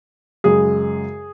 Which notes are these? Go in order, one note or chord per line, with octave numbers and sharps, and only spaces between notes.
F#2 C#3 G#3 G#4